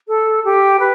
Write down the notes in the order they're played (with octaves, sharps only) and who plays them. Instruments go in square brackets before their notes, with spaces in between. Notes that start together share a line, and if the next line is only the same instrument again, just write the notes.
[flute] A4
G4
B4